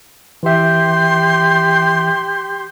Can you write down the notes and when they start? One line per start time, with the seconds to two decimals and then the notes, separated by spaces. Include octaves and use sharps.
0.43 E3 G4 E5 C6